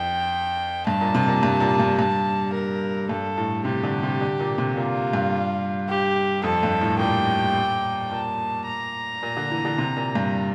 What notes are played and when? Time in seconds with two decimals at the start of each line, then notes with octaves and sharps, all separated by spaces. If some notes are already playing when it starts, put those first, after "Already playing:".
Already playing: F2 G5
0.87 G2 A5
1.01 A#2
1.15 C3
1.28 A#2
1.43 G2
1.60 A#2
1.80 G2
1.98 G2 A5
2.54 A#4
3.09 G2 A4
3.38 A2
3.65 C3 G4
3.84 D3
4.03 C3
4.21 D3
4.40 A#2
4.58 C3
4.77 A#2 F4
5.13 G2
5.89 G4
6.44 F2 A4
6.63 G2
6.81 A2
6.99 A#2 G5
8.11 A#2 A5
8.68 A#5
9.23 A#2
9.37 D3
9.51 E3
9.65 D3
9.78 C3
9.97 A#2
10.15 G2